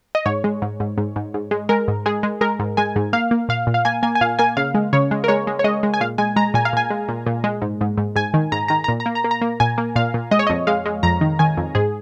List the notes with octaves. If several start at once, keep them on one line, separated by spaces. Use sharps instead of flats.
D#5
G#2 C#5
G#3
G#2
G#2
G#2
G#2
G#2
G#3
G#3 A#4
G#2
G#3 G#4
G#3
G#3 A#4
G#2
G#3 G#5
G#2
A#3 F5
A#3
A#2 F5
A#2
F5
A#3 G#5
A#3 G#5
G#5
A#2 F5
A#3 G#5
C#3 F5
G#3
C#3 C#5
G#3
A#4
G#3 C#5
G#3
C#5
G#3 D#5
G#3
G#5
A#2 F5
G#3 G#5
G#3 A#5
A#2 G#5
F5
A#2 G#5
G#3
A#2
A#2
G#3
G#2
G#2
G#2
G#2 G#5
D#3
G#2 A#5
D#3 A#5
A#5
A#2
A#5
A#3
A#5
A#3
A#5
A#3
A#2 G#5
A#3
A#2 F5
A#2
G#3 D#5
C#5
D#5
F2
G#3 F5
G#3
F2 A#5
D#3
D#3 G#5
F2
G#2 G#4